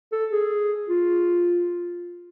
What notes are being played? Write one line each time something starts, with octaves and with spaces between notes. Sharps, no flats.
A4
G#4
F4